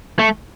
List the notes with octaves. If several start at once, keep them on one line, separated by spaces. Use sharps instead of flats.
A3